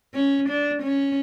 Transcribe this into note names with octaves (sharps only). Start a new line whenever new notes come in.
C#4
D4
C#4